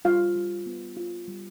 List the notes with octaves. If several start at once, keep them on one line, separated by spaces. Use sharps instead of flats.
G3 F4 F5
G3
B3
F4
G3